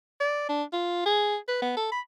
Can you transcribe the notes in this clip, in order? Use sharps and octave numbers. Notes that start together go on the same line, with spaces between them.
D5
D4
F4
G#4
B4
B3
A4
B5